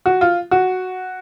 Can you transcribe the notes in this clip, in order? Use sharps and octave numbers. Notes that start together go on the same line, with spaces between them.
F#4
F4
F#4